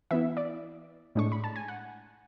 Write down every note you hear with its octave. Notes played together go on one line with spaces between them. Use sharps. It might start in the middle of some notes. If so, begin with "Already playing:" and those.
E3 B3 E4 E5
D5
A2 G#3 D4 C#6
B5
A5
G#5
F#5